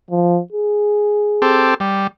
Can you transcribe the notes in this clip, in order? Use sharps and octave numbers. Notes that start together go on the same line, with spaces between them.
F3
G#4
C4 G4 A4
G3